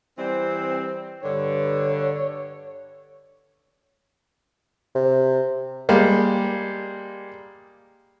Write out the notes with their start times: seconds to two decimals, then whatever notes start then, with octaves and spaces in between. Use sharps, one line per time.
0.17 E3 G3 C4
1.23 G2 D3 C#5
4.95 C3
5.89 G3 G#3 A#3